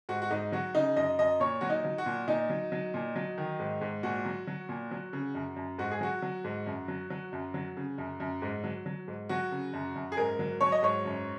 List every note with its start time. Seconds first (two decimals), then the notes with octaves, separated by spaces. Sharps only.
0.09 G#2 F#4
0.22 F#4
0.31 G#2 D#4
0.52 F#3 F#4
0.75 C#3 D#4
0.96 F#2 D#5
1.19 F#2 D#5
1.40 A#2 C#5
1.61 F#3 F#4
1.70 D#4
1.85 F#3
1.98 F#4
2.06 A#2
2.28 A#2 D#4
2.50 F#3
2.72 F#3
2.94 A#2
3.16 F#3
3.38 D#3
3.59 G#2
3.81 G#2
4.03 A#2 F#4
4.25 F#3
4.47 F#3
4.69 A#2
4.91 F#3
5.13 C#3
5.35 F#2
5.56 F#2
5.78 G#2 F#4
5.91 G#4
6.01 F#3 F#4
6.22 F#3
6.44 G#2
6.66 F#2
6.88 F#3
7.10 F#3
7.33 F#2
7.54 F#3
7.77 C#3
7.98 F#2
8.20 F#2
8.42 G#2
8.64 F#3
8.86 F#3
9.08 G#2
9.29 F#3 F#4
9.52 C#3
9.73 F#2
9.95 F#2
10.12 G#4
10.17 G#2 A#4
10.39 F#3
10.61 F#3 C#5
10.72 D#5
10.83 G#2 C#5
11.05 F#2